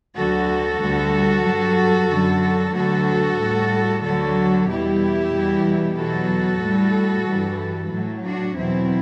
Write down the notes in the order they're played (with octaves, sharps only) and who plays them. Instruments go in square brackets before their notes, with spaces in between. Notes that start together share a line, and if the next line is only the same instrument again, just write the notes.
[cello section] D2 D3 F#3 F#4 A4
D2 D3 G3
G2 F#3
F#2 D3 F#3
D2 D3 F#3 F#4 A4
A2 G3
D2 D3 F#3 F#4 A4
E2 B2 G3 E4 G4
E2 B2 G3
E2 B2 F#3 F#4 A4
A2 G3
G2 E3 G3
A2 F#3
D4 F#4
E2 B2 F#3 C4 E4